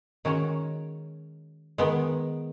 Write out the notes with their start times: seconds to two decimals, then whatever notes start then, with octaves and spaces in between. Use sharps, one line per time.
0.25 D#3 G#3 C#4 F#4 C#5
1.78 D#3 G#3 B3